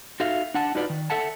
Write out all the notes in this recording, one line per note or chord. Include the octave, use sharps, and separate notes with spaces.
D#4 F#4 A4 E5 F5
D4 F#5 A5
D#4 F4 F#4 B4 D5
D#3
A4 E5 F#5 A5